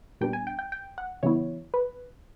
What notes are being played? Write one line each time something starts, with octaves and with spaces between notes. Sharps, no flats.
A#2 G3 B3 D4 G5
G#5
G5
G5
G5
F#5
C#3 E3 G3 B3 E4 C#5
B4